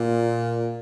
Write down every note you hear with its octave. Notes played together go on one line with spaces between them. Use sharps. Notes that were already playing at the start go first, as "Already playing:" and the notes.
Already playing: A#2